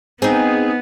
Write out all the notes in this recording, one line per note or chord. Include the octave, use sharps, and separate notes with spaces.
B3 C4 D#4 G#4